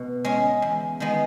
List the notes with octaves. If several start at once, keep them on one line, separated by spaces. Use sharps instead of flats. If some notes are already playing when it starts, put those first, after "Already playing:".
Already playing: B2
G#3 C#4
E2
D#3 G#3 B3